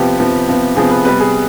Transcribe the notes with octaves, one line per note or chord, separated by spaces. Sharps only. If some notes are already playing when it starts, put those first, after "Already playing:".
Already playing: C3 F3 B3 G4
C3 F3 B3
C3 F3 B3
C3 F3 B3 G#4
B4
C3 G3 B3 B4
G#4